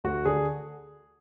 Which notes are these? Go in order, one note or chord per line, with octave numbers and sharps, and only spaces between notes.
D2 F#4
D3 G#4